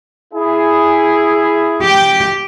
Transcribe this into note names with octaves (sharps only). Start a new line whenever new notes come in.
E4 G#4
G4 G5